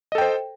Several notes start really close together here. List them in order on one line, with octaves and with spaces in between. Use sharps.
D#5 A4 G5 C5